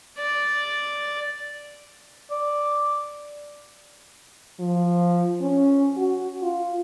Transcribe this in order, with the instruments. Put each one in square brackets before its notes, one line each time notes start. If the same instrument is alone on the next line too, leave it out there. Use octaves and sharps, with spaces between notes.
[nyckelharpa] D5
[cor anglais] D5
[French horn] F3
C#4
F#4
F4